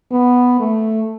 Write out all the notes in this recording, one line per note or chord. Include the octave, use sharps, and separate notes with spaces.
B3
A3